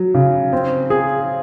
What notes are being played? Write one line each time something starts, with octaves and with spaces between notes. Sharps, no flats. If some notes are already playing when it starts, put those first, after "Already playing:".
Already playing: F#3
C#3
C4
G#4